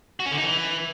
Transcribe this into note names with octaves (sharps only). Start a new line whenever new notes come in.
F#4
C#4
D3
D#4
E3